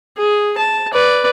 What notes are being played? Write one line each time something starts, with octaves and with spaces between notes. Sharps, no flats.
G#4
A5
B4 D5